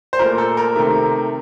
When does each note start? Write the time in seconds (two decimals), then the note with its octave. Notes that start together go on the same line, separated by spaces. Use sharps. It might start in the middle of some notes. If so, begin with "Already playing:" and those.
0.13 C5
0.19 A#2 A3 A#4
0.38 A4
0.57 A#4
0.76 C3 D#3 A3